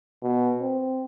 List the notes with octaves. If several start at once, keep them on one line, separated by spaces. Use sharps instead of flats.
B2
C4